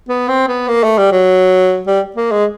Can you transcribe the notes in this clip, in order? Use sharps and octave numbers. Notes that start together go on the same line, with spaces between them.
B3
C4
B3
A#3
A3
G3
F#3
G3
A#3
G#3